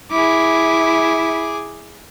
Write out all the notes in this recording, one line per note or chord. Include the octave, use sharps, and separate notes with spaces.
E4 G#4 D6